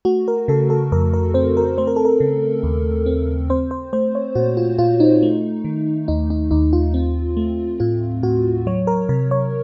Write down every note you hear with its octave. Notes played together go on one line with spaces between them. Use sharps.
A3 F#4
A#4
C#3 A4
A4
F2 A#4
A#4
C4 C5
A#4
A3 C5
A#4
A4
A#4
C#3
D#2
C4
C4 C5
C5
A3 C5
C#5
A#2 F#4
F4
A#2 F4
D#4
A3
D#3
D#2 D#4
D#4
D#2 D#4
F4
C4
A3
A2 F4
A2 F#4
F#3 C#5
A#4
C3 A#4
C#5